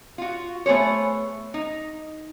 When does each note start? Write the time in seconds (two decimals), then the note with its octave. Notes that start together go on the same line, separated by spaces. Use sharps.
0.18 F4 F#4
0.66 A3 B3 G#4 C5 C#5
1.54 D#4